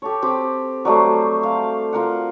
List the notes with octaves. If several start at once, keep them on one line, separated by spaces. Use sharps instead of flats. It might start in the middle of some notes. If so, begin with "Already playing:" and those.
G4 A4 C#5
C4 G4
F#3 G3 A3 C5
F5
F4 A#4 F#5